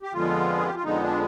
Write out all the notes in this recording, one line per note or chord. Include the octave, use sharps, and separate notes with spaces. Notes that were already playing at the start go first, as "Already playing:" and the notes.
G4
F2 D3 F3 G#3 B3 F4
G#4
G4
F4
F2 D3 F3 G#3 B3 D#4
D4